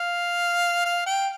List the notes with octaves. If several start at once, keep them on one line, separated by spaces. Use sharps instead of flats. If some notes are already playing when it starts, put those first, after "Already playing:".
Already playing: F5
F5
G5